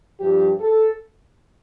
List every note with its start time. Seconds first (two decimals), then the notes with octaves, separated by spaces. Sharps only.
0.18 G2 F3 G4
0.59 A4